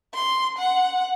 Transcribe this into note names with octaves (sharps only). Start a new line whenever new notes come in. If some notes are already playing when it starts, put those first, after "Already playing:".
C6
F#5